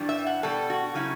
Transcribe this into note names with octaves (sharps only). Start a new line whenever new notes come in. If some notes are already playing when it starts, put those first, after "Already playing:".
Already playing: G2 E3 G3 D4
E5
F#5
B2 G3 D4 A4
F#4
C#3 F#3 A3 C#4 E4